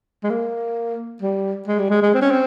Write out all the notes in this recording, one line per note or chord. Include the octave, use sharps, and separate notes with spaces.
G#3
A#3
G3
G#3
G3
G#3
G#3
C4
C#4
C4